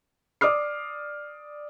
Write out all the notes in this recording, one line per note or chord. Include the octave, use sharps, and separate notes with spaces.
D5 D6 D#6 F6 C7